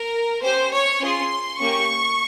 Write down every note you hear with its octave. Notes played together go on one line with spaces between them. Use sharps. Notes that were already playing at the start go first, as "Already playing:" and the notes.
Already playing: A#4
C#4 G4 C5
C#5
C#4 F4 G#4 C6
A#3 C#4 G4 C#6